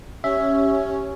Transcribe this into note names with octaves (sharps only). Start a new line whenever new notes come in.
C#4 G4 E5